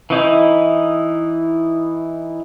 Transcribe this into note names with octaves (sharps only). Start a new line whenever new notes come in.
E3 D#4 E4